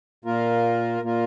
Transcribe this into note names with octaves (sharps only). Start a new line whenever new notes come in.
A#2 A#3 F4 A#4
A#2 A#3 F4 A#4